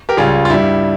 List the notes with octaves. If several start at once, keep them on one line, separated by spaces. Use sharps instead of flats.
G4 A#4
C#2 C#3 G3 F4 G#4
F4
G2 G3 E4